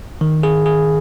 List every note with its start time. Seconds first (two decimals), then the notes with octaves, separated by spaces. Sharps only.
0.21 D#3
0.43 G#4
0.66 G#4